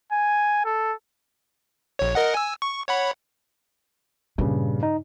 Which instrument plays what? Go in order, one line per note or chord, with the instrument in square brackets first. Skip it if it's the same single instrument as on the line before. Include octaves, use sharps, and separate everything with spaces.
[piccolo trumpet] G#5
A4
[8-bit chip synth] A#1 C#5
A#4 D#5 F#5
G#5 E6
C#6
C#5 F#5 B5
[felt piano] G2 C#3 [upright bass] A#2
[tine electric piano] D#4